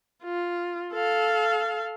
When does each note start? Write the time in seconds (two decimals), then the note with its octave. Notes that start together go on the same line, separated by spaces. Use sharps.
0.24 F4
0.94 A4 F5